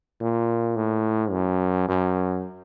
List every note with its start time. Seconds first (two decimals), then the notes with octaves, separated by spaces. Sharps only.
0.21 A#2
0.76 A2
1.32 F#2
1.88 F#2